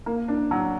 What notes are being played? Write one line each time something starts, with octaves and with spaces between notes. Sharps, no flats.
A#3
D4
F#3